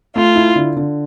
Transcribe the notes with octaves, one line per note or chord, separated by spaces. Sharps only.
A3 F4
E4
D3
D3